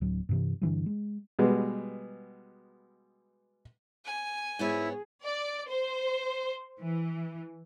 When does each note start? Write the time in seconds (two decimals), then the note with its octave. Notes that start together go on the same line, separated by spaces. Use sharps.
0.01 D1 F#3
0.29 G2 C3 E3
0.61 G2 D3 E3 G3
0.86 G#3
1.39 B2 G3 G#3 B3
4.06 G#5
4.59 G#2 B3 E4 G#4 C#5
5.23 D5
5.69 C5
6.79 E3